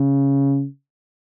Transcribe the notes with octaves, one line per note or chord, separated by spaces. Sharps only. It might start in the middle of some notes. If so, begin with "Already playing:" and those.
Already playing: C#3